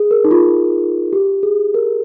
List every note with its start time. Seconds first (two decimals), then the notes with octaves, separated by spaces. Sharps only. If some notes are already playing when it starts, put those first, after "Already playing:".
Already playing: G#4
0.11 A#4
0.24 D#4
0.31 F4
1.13 G4
1.43 G#4
1.74 A#4